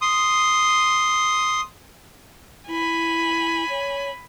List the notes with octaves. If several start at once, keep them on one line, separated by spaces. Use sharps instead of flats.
C6 D#6
E4 G#5 B5
C#5